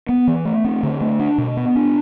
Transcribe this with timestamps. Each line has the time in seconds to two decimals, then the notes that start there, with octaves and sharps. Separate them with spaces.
0.09 B3
0.27 E3
0.45 A3
0.64 C4
0.83 D3
1.01 A3
1.19 D4
1.38 B2
1.57 B3
1.76 D4